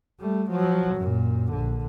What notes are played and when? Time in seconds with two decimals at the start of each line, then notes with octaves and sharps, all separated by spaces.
0.20 G3 A3
0.51 F3 F#3
0.95 F#2 A#2
1.52 A#1 D3